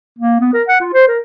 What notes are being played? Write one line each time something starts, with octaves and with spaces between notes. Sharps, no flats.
A#3
B3
A#4
F#5
F4
C5
A#4